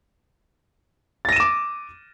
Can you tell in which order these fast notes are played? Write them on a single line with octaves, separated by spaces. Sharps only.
A6 A#6 D#7 E7 D6